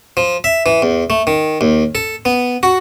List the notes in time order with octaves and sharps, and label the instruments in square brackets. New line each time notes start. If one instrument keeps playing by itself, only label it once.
[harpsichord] F3
E5
E3
E2
A3
D#3
D#2
A4
B3
F#4